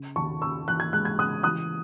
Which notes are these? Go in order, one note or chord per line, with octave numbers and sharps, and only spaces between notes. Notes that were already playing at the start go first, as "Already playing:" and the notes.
Already playing: C#3
D#2 A5 C#6
C#3 C#6 E6
E3 F#6
G#6
G#3 F#6
G#6
C#3 D#6 F#6
E3 D#6 F#6